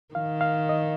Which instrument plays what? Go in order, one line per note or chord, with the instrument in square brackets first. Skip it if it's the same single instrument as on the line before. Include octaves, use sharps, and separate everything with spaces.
[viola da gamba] D#3 [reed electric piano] F5
[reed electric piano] F5
D#5